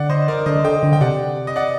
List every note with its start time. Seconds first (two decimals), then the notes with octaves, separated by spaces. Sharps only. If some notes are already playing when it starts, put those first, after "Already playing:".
Already playing: D3 D5 F#5
0.09 C5 D#5
0.28 A#4 D5
0.46 D3 C5 D#5
0.64 D3 D#5 G5
0.83 D3
0.93 G5
1.01 C3 D5 F#5
1.47 D#5
1.56 D5 F#5